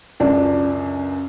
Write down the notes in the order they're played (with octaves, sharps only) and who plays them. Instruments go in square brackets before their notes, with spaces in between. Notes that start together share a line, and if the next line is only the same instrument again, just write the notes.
[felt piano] C#2 F#2 D4